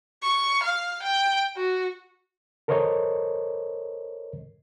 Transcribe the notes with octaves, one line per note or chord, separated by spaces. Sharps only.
C#6
F5
G5
F#4
A4 A#4 C5 C#5 D#5